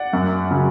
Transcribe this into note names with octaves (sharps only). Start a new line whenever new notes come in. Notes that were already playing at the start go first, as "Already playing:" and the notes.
Already playing: D5 F#5
F#2
C#3 F#3